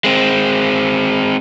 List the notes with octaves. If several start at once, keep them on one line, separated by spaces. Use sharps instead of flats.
G#3 C4